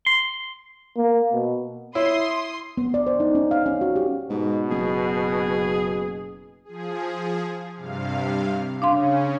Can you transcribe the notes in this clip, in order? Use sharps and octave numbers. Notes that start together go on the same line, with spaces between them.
C6
A#3
B2
E4 C#5 C6 D#6
B3
D5
C5
D#4
C#4
F5
C#4
F#4
G4
G#2 B2
F#1 G#4
F3 G#4
G2 C3 F5
C#3 C#4 D4 F5 C6